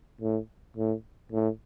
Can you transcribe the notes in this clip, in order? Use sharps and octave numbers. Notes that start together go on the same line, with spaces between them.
A2
A2
A2